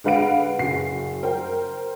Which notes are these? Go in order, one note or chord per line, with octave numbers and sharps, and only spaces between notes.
D3 G#3 B4 F5 F#5 D7
F#1 F#4 C7
A#4 C5 G5